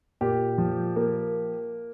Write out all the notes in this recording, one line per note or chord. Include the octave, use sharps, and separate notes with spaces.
A#2 G4
F3
A#3